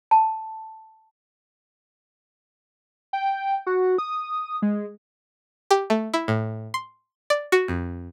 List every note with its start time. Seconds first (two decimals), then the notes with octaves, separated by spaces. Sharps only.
0.11 A5
3.13 G5
3.67 F#4
3.98 D#6
4.62 G#3
5.71 G4
5.90 A3
6.14 E4
6.28 A2
6.74 C6
7.30 D5
7.52 F#4
7.68 F2